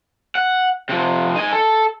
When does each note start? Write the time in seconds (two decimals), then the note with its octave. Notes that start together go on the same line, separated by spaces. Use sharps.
0.35 F#5
0.89 C3 F3
1.36 D#4 G#5
1.52 A4